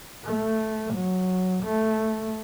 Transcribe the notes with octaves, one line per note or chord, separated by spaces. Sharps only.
A3
F#3
A3